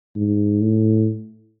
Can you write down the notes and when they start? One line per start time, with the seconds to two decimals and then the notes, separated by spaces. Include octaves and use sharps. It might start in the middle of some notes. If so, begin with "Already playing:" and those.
0.16 G#2
0.62 A2